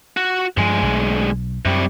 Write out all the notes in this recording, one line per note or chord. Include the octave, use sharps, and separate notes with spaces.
F#4
D2 G2 F3 G#3
B1
F#2 C3 G3